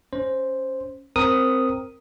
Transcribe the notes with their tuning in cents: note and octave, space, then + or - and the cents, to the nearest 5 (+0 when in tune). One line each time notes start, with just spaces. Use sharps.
C#4 +0 C5 +0
C4 +0 A#4 +0 D#6 +0